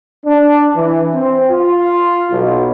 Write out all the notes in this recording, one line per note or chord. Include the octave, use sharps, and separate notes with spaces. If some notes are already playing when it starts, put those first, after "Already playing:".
D4
E3
C4
F4
B1